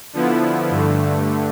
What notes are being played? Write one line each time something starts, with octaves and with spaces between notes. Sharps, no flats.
D3 F3 B3 E4
G2 D3 A3